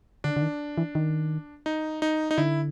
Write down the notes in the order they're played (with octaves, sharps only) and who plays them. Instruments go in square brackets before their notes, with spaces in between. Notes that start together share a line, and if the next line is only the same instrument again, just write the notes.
[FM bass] D3 [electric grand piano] D4
[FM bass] D3
D#3
E3
D#3
[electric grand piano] D#4
D#4
D#4
[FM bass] D3 [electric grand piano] E4